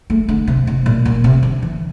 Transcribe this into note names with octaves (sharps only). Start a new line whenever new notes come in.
A3
D3
C3
C3
A#2
A#2
C3
D3
E3